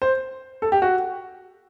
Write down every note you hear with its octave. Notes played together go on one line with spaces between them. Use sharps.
C5
A4
G4
F#4